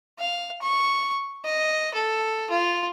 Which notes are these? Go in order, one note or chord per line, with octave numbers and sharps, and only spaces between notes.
F5
C#6
D#5
A4
F4